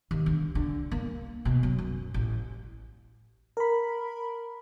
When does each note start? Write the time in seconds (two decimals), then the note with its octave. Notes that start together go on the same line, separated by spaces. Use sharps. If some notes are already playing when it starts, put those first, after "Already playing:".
0.11 D#2
0.26 D3
0.55 D3
0.91 A#3
1.45 B2
1.63 F#3
1.78 F#2
2.14 A1
3.57 A#4 B5